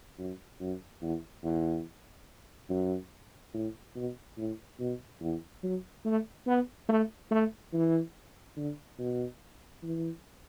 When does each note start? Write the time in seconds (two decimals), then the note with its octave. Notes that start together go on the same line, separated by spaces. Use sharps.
0.18 F#2
0.60 F#2
1.02 E2
1.43 E2
2.70 F#2
3.54 A2
3.95 B2
4.38 A2
4.79 B2
5.21 E2
5.63 F#3
6.05 A3
6.47 B3
6.89 A3
7.31 A3
7.73 E3
8.57 D3
8.99 B2
9.83 E3